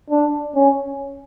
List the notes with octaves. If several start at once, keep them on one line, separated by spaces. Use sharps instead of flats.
D4
C#4